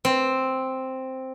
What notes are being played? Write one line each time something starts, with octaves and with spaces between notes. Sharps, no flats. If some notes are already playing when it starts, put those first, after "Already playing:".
C4